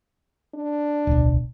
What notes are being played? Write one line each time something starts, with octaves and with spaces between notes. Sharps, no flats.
D4
D1 B1